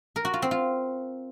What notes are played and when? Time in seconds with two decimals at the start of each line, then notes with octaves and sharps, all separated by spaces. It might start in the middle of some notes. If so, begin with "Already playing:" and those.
0.16 A#4
0.25 F#4
0.34 F4
0.42 C4
0.51 F4